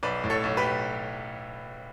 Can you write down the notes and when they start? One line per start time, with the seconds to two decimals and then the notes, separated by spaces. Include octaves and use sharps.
0.03 B1 B4 D5
0.24 A2
0.30 A4 C#5
0.43 B1
0.57 G4 B4
0.64 B1